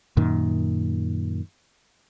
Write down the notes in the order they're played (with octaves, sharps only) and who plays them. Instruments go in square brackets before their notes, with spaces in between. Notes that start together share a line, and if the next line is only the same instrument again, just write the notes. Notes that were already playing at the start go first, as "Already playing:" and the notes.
[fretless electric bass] F#2 A#2 D#3